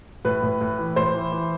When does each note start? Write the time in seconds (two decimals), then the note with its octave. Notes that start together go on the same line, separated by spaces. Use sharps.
0.25 A2 B4
0.43 A2
0.61 A2
0.78 E3
0.96 A2 C5
1.14 E3
1.32 E3